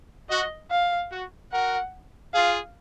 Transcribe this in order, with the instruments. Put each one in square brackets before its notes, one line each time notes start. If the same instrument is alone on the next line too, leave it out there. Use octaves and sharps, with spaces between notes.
[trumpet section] F#4 [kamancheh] D#5
[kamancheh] F5
[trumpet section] F#4
[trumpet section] F#4 A#4 [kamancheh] F#5
[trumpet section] F4 G#4 [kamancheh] F5